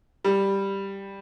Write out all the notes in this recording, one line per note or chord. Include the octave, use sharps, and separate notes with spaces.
G3